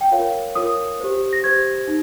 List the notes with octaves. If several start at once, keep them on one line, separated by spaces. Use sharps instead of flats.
G5
F4 A#4 C#5 F5
F4 A#4 C#5 D#6
G4 C5
A#6
G4 C5 G#6
D#4